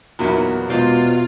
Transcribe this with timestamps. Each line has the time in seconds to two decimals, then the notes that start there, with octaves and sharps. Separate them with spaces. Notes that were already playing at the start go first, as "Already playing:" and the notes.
0.19 E2 A#2 F#3 B3 D#4 E4
0.70 B2 G#3 F4 C5 D5